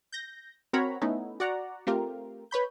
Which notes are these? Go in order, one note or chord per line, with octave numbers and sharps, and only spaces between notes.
G6 A#6
C4 F#4 A#4 C#5 A#5 B5
A3 B3 C#4 D#4 E4
F#4 D5 F#5 A#5
A3 C4 F4 G4 A#4
B4 C#5 B5 G6